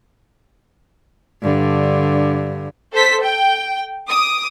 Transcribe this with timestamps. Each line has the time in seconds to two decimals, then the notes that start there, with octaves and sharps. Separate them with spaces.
1.42 G2 D3
2.93 A4 C5 B6
3.21 G5
4.10 D6 D#6